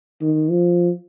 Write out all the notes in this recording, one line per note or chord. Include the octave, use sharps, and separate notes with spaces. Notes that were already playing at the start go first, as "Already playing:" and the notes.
D#3
F3